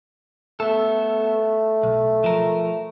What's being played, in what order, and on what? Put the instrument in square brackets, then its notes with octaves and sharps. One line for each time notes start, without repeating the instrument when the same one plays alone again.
[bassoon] A3 [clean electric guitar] B3 A4
[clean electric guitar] B1
F3 A#4